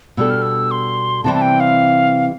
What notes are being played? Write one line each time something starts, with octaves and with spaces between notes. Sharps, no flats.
B2 G3 D4 A4 E6
F6
E6
C6
C3 E3 G3 C4 E4 A5
A5
G5
F5